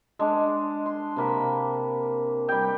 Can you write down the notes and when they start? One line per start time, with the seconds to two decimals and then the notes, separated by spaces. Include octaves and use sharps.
0.19 G#3 D4
0.86 C6
1.16 C3 A#3 B5
2.49 G3 G5